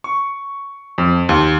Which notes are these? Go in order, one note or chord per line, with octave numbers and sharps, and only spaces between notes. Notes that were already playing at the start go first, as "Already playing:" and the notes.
C#6
F2
D#2